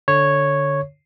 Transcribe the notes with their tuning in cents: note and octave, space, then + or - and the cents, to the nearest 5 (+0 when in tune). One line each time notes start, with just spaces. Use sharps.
D3 +0 C#5 -5